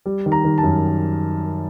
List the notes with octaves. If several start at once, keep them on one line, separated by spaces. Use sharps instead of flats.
G3
D#3
A#5
D#3
A5
F#2